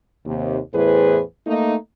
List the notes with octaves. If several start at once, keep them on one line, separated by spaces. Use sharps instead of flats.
D#2 C3
E2 A2 G#4 B4 C5
A3 A#3 D#4